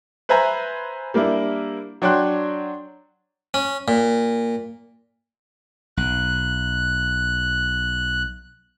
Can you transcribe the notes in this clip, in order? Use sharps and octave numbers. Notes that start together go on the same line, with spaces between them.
B4 C5 E5 G#5 A#5
G3 A#3 D4 E4
F#3 D4 C#5 G5 C6 F#6
C#4
A#2
B1 F#6